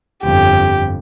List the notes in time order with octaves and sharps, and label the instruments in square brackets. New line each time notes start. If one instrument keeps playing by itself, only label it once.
[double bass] G1 F2 [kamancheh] G4